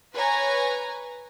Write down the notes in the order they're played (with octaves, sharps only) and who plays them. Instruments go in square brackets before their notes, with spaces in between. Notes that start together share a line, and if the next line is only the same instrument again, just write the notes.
[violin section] B4 C#5 G#5 A#5